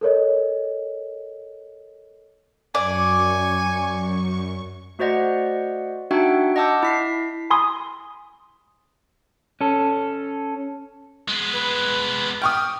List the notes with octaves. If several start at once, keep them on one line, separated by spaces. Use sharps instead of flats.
A4 A#4 C#5 D#5
F#2 D5 G#5 C#6
A3 F#4 C5 D5 D#5 F#5
D4 D#4 F#4 E5 F#5 G5
D#5 F#5 A5 D6 E6 G6
E4 B6 C7
G#5 B5 C6 D#6
C#4 A4
G#3 B3
B4
G5 C#6 D#6 F6